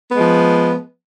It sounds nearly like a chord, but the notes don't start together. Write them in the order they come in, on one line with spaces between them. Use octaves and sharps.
B3 G#3 F3